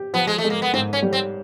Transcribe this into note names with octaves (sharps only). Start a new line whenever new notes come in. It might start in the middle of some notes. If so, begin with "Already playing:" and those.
Already playing: G4
F3 B3
G#3
A3
G#3
A#3
B3
G#2 C4
C#4
G3
C4